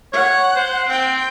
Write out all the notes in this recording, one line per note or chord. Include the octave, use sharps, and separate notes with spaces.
C#5 F#5
C5
C4 G5